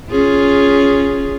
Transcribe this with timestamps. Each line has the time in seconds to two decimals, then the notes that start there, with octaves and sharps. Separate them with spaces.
0.11 C#4 F4 G#4